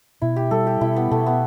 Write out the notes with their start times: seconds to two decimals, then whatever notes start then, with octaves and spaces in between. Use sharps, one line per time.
0.22 B2 E4
0.36 G4
0.51 G3 A4
0.67 G4
0.81 B2 E4
0.96 B3
1.11 B2 A3
1.26 B3